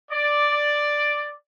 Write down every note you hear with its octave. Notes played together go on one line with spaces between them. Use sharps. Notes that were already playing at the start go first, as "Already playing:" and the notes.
D5